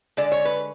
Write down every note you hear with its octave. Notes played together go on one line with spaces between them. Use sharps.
D3 G#3 D5
C#5
B4